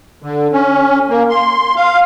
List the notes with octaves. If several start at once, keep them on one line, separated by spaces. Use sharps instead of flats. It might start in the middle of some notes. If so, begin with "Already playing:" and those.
D3
C#4
A#3
C6
F5